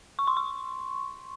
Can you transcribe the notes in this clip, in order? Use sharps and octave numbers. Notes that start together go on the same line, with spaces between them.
C#6
C6
C#6